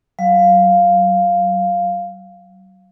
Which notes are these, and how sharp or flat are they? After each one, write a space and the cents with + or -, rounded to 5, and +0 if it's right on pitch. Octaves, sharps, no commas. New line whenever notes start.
F#3 +35 F5 +0